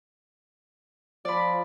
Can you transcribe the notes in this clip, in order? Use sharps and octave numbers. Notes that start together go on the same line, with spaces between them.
F3 D5 B5